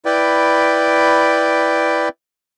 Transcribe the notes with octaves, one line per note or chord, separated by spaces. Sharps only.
E4 B4 D5 G5